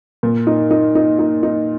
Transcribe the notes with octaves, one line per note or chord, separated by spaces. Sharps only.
A#2
D#4
D#4
D#4
D#4
D#4